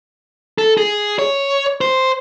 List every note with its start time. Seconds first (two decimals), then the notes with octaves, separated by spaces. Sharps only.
0.58 A4
0.78 G#4
1.19 C#5
1.81 C5